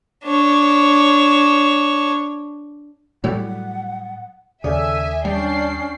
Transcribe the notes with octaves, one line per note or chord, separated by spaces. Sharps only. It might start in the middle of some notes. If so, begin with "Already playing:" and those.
D4 C#5
A2 F#3 G3 F#5
D#2 C#3 A4 D5 E5 G#5 D#6
G3 C#4 D4 G5 C7